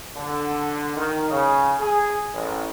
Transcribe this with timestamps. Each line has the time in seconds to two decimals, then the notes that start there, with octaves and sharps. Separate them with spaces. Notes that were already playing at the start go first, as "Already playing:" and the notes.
0.16 D3
0.96 D#3
1.30 C#3
1.80 G#4
2.33 A1